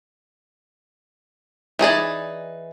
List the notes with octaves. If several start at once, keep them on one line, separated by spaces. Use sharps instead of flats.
E3 D#4 G#4 D5